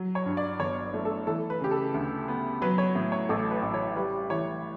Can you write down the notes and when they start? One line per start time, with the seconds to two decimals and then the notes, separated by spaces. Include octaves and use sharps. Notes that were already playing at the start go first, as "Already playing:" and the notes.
Already playing: F#3
0.15 C#5
0.26 G2
0.37 D5
0.59 G1 C#5
0.94 A3
1.05 A4
1.27 E3 A4
1.50 B4
1.61 C#3 G4
1.71 A4
1.94 D2
2.28 B3
2.62 F#3 B4
2.78 C#5
2.95 A2
3.12 C#5
3.29 A1 A4
3.51 B4
3.63 A1
3.74 C#5
3.96 G3 B4
4.30 E3 C#5